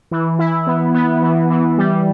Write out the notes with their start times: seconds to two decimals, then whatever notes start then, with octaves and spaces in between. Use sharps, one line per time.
0.11 E3
0.39 E4
0.67 B3
0.94 B3
1.22 E3
1.50 E3
1.78 G3